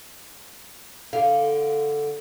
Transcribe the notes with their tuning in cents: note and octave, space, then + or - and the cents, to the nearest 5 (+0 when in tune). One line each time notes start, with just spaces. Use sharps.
D3 +0 F5 +0